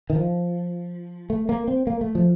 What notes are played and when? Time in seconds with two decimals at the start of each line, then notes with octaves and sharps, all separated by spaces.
0.10 D#3
0.15 F3
1.30 A3
1.49 A#3
1.68 C4
1.87 A#3
2.01 A3
2.15 F3